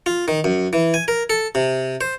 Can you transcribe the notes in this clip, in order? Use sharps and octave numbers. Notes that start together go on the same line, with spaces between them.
F4
D#3
F#2
E3
G#5
A#4
A4
C3
C5